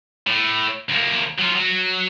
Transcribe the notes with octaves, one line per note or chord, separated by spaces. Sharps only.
A2
D2 A#3
F#3 F4
F#3